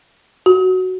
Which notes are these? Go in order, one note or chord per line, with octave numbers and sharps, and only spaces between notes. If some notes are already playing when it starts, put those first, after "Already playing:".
F#4